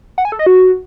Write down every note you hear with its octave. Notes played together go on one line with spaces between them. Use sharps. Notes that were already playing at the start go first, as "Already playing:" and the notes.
F#5
G#5
A4
D#5
F#4